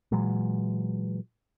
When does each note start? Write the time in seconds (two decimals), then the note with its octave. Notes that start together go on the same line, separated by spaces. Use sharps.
0.12 A#2 E3 F#3 G#3